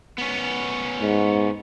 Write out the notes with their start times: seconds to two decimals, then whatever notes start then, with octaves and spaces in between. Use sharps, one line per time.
0.18 B3 C#4
1.02 G#2